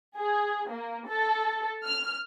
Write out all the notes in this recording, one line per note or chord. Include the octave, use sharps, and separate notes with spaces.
G#4
A#3
A4
F6